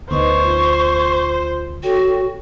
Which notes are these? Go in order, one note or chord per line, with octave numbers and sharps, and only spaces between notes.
D2 B3 D#4 B4 C5 D#5 C#6
F4
F#4 A4 C#5 G5